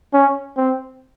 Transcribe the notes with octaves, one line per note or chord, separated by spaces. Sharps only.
C#4
C4